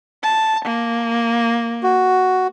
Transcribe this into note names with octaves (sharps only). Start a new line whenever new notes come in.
A5
A#3
F#4